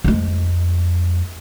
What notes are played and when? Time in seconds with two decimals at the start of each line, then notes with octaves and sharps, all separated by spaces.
0.04 F2 G#3